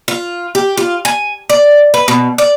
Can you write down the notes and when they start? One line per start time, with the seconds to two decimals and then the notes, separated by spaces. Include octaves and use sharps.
0.08 F4
0.55 G4
0.77 F4
1.05 G#5
1.50 D5
1.94 B4
2.08 B2
2.38 D5